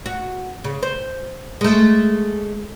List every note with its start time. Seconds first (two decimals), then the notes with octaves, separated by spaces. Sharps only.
0.06 F#4
0.64 C#3
0.83 C5
1.61 G#3 A3